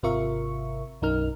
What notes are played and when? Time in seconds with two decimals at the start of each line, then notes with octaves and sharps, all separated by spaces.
0.03 G#1 C3 F4 A#4 E5 C#6
1.02 B1 F#2 D#4 A#4 F6